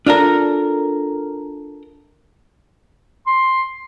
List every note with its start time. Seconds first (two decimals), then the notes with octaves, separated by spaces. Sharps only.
0.06 D4 F4 A4 A#4
3.27 C6